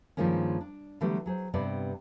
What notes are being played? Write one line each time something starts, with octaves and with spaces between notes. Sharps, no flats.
G2 D#3 F3 G#3 A#3 C#4
D4
D3 E3 F#3 G3 A3 B3
F#3 G#4 C5
G2 C3 B3 B4 D5 G5